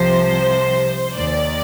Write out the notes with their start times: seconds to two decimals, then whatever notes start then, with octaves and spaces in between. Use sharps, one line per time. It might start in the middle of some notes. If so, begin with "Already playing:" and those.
Already playing: C2 C3 F3 C5
1.14 D#2 D#3 D5